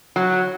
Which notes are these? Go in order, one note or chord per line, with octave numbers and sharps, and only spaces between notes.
F#3